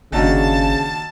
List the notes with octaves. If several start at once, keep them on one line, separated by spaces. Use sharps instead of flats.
G1 D#2 C#3 D4 F#4 A5